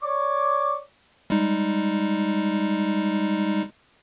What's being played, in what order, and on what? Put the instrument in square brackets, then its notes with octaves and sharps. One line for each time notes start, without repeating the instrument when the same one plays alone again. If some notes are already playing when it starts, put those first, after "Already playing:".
[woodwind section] C#5 D5 C#6 D6
[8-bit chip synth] G3 G#3 D#4